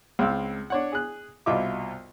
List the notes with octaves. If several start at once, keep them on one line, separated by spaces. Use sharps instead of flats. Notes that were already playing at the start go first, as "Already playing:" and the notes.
C#2 C4 F5 E6
D4 C#5 F#5
G#4 F#6
C2 B2 F4 D#5 E5 D6